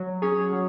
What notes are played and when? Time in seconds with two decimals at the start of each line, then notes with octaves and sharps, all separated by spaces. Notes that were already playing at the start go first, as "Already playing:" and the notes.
Already playing: F#3
0.22 C#4 G#4 C#5
0.53 F#3